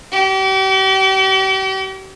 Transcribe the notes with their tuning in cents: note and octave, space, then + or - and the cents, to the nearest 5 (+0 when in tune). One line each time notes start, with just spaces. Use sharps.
G4 -40